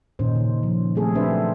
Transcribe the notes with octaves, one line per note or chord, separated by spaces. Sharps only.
A#2 D#3 C#4 D#4 C5
C#3
F3
G3 A3 C4 G#4 A4
F#3 C4 D4 B4 C5 E5